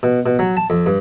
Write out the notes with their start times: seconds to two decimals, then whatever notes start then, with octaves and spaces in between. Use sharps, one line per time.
0.03 B2
0.26 B2
0.39 F#3
0.57 A5
0.70 F2
0.86 G2